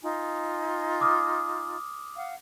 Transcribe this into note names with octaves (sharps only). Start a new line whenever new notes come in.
D#4 F4 G#5
D6 D#6 F6
F5 F#5